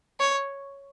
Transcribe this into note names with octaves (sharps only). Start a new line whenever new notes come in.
C#5